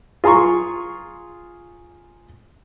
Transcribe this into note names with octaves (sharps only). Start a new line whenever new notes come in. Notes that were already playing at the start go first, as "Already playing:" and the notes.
F4 G#4 A#5 C6 C#6